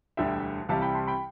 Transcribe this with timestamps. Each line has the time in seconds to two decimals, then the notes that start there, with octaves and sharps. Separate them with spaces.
0.17 E1 D2 D3 G3 E5 G5
0.69 C2 C3 E3 G3 F5 A5
0.82 G5 B5
0.94 A5 C6
1.07 G5 B5